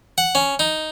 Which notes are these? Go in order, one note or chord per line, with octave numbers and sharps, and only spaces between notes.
F#5
C#4
D#4